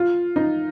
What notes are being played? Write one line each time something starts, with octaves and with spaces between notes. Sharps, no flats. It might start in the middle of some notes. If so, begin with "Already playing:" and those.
Already playing: F4
D#4